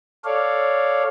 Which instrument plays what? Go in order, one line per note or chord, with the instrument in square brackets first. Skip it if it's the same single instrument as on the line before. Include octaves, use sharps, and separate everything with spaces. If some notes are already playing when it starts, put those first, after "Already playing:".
[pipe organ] A4 C#5 D5 F5